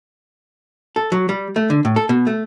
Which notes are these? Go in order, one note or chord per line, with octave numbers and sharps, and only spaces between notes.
A4
F#3
G3
A3
D3
A2
A4
B2
A3